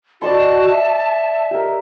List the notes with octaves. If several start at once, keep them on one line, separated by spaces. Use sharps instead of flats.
F#4 D5 D#5 A5 C6
E5
G4 A#4